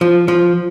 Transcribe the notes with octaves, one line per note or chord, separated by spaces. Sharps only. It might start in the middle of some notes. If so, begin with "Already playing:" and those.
F3
F3